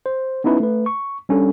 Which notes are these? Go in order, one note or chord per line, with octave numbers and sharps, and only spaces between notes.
C5
B3 C#4 D#4 E4 B4
A3 B4
C#6
G3 C#4 D4 A4